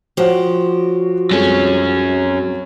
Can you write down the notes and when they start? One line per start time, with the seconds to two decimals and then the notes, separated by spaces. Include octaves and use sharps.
0.17 F3 F#4 G4 C#5 F#5
1.31 C2 F#2 G#3 C#4 A4